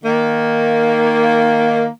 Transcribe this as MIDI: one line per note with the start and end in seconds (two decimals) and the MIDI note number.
0.04 1.87 51
0.04 1.87 58